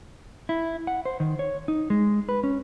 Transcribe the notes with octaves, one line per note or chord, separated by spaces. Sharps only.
E4
F#5
C5
D#3
C#5
D#4
G#3
B4
C#4